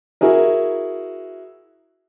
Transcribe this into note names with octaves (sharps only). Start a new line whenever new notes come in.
E4 F#4 G#4 A#4